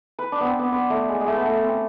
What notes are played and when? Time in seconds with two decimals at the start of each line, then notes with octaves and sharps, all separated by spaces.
0.19 B4
0.32 D4
0.40 B3 C4
0.59 B3
0.72 B3
0.90 A3
1.09 G#3
1.21 G#3
1.27 A3
1.36 B3
1.45 A3
1.63 C4